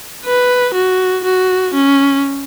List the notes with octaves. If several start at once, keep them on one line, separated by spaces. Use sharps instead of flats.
B4
F#4
F#4
C#4